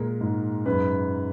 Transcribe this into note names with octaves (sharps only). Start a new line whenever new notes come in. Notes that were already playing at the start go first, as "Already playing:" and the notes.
Already playing: A#2 G#3 A#4
G#2
F#2 B4